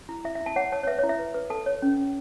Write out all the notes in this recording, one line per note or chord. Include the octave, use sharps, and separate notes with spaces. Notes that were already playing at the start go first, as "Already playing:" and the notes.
E4
E4 E5
E5
E4
A5
C#5 F#5
C#5 A5
C#5
B4 E5
C#5
E4
E5
B4
B4
A4 A5
C#5
C#4
C#4